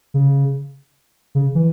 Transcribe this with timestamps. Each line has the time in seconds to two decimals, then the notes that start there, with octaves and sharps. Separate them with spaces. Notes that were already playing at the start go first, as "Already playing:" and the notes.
0.14 C#3
1.35 C#3
1.55 E3